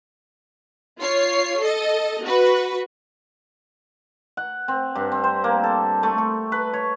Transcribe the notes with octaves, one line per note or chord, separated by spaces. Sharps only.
F4 C#5 C7
A4 D#5
F#4 B4
F#5
C4
G2
C4
C5
A#3
A4
A3
C#6
B4
C#5